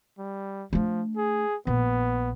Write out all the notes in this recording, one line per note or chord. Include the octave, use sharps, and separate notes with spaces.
G3
F3 A3 D4
G#4
A#1 B3